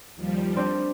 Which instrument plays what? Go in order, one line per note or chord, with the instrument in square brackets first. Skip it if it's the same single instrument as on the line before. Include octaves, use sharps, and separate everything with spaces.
[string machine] D#2 F3 G3
[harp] C4 D4